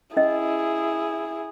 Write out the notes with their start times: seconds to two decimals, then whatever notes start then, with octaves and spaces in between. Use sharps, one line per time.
0.17 C#4 E4 G#4 D#5